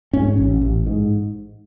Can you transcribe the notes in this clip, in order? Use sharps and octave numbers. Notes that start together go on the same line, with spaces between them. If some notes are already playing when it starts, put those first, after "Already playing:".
G#2 C#4
A1
A1
G#2